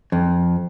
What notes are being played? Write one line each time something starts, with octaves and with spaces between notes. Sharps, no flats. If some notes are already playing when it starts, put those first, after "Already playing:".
F2